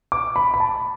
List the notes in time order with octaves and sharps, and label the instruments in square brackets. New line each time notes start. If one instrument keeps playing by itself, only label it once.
[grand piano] D6
B5
B5
A5